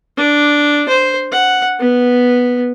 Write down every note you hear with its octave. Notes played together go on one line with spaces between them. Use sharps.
D4
C5
F#5
B3